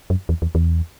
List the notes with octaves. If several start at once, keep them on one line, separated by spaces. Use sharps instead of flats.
F#2
E2
E2
E2